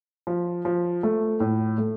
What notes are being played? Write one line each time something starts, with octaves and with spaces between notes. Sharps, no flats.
F3
F3
A3
A2
A3